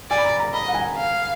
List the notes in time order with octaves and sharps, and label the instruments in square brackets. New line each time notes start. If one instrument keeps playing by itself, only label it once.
[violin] D5 [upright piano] G#5
[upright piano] B5
A#5
A#5
[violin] D#5 [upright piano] B5
[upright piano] F#5
G#5
[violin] F5